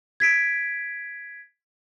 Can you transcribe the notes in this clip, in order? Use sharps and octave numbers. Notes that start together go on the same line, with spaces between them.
G#6 B6 D7